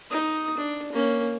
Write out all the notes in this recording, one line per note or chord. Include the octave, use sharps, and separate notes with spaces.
D#4 D#6
D4
A#3 C#4